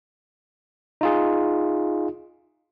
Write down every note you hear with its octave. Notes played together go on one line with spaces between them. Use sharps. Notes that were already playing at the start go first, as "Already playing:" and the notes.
D#4 F4 G#4